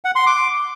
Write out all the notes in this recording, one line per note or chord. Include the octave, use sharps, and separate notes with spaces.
F#5
C6
D6